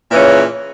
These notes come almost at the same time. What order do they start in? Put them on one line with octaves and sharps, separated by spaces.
A#2 E3 C#4 C#3